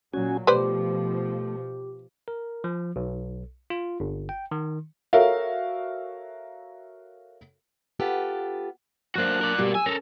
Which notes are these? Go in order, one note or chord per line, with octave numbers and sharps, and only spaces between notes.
A#2 F#3 C#4 F#4 G#5
B2 F3 A3 G4 B4 C5 D5
A#4
F3
B1
F4
G1
G5
D#3
F#4 A4 A#4 C#5 E5 F5
B3 F4 G4 A4
F#3 A#3 D4 F#4 C5 F#6
A#4 D5
B2 G3 A#3
G#4 G#5 E6
C#4 A4 A#4